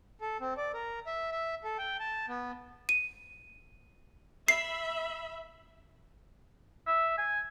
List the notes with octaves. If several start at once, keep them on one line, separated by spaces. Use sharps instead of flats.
A4
C4
D5
A#4
E5
E5
A4
G5
A5
B3
D#7
E5 B5 C7
E5
G#5